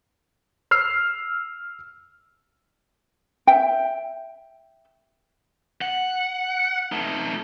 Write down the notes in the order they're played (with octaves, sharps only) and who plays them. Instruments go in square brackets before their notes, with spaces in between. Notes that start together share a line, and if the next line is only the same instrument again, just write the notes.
[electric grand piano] E6 F6 C7
[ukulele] E5 G5
[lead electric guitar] F#5
A3 D#4